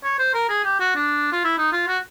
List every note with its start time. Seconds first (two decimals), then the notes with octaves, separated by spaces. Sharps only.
0.04 C#5
0.19 C5
0.34 A#4
0.49 G#4
0.65 G4
0.80 F#4
0.96 D4
1.32 F4
1.45 E4
1.58 D#4
1.73 F4
1.88 F#4